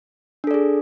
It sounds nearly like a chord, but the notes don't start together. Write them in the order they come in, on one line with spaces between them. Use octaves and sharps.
D4 A4 D5 G#4